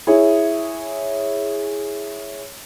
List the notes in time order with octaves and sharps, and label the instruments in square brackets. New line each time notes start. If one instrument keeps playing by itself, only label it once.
[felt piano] E4 G#4 C#5